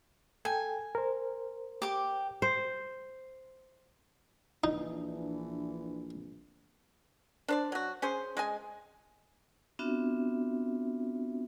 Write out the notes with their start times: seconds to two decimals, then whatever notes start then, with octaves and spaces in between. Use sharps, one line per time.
0.45 A4 G5 G#5
0.95 A#4 C5
1.82 G4 D6
2.42 C5
4.64 A#1 E3 D4 D#4
7.48 D4 C5 D5
7.72 F#3 F#4
8.02 C#4 G#4 C5
8.37 G#3 D#5 G#5
9.79 B3 C4 D4 F4 F#4 E5